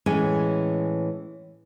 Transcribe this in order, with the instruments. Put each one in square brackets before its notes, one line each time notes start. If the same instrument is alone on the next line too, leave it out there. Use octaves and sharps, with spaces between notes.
[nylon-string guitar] A2 E3 G#3 C#4 G#5